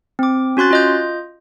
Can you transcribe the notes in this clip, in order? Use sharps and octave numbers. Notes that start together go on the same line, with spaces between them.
C4 D6
C#4 F#4 C6 F#6 A6
F4 D#5 G6